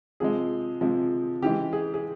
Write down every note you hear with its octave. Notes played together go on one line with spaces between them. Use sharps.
C3 F3 G#3 G#4
C3 F3 G#3
C#3 E3 G#3 G4
G#4
G#4